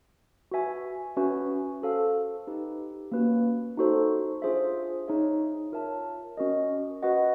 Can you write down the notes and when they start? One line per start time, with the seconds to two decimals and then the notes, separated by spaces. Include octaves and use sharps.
0.51 F#4 B4 E5 G#5
1.17 C#4 F#4 B4 E5 G#5
1.82 F#4 A4 C5 F5
2.47 D#4 G4 B4
3.12 A#3 C#4 F#4 B4
3.77 D#4 F#4 A4 C5
4.42 D4 F4 G#4 C5 E5
5.08 D#4 G#4 C#5 E5
5.72 F4 A#4 C#5 E5 A5
6.37 C#4 F#4 A#4 D#5
7.02 F#4 B4 D#5 F#5